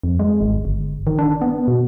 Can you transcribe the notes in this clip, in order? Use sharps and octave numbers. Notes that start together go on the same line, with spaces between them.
F2
G#3
G#1
G1
D#3
D4
B3
B2